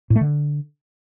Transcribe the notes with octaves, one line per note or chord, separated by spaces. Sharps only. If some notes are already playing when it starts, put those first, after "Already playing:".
A2
A3
D3